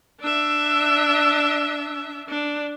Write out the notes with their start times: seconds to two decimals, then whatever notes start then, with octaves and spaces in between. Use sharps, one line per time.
0.21 D4 E5
2.30 D4